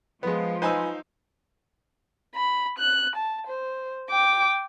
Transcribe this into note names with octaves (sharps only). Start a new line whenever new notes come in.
F3 G#3 B3
D#4 B4 C5 G#5 E6
B5
F#6
A5
C5
G5 D6